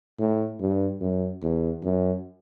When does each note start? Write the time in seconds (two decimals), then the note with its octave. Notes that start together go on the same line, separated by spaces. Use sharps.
0.19 A2
0.60 G2
1.00 F#2
1.42 E2
1.83 F#2